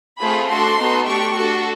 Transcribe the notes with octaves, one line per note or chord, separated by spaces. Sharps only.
A3 C4 F4 G#4 B5
D4 F#4 A4 C6
B3 D#4 F#4 A4
A3 D4 G4 C#6
D4 F#4 A4